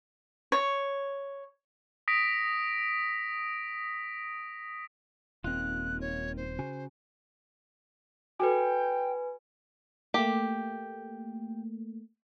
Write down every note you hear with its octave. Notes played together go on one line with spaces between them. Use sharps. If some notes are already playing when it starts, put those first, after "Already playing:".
C#5
D#6 A#6 B6 D7
D#1 A#3 C4 D#4 F4 F#6
C#5
C5
C#3 F#4 G#5
F#4 A4 B4 G5 G#5
A3 A#3 G4